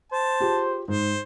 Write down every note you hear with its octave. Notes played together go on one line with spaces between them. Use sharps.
C5 A5
F4 G4 G#4
G#2 C5